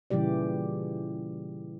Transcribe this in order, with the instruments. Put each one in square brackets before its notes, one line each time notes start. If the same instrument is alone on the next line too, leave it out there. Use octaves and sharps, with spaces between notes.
[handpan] A#2 C#3 E3 G3 G4 D5